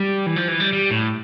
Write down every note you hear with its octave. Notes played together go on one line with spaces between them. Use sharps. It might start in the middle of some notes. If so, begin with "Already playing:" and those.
Already playing: G3
E3
F3
E3
G3
G3
A2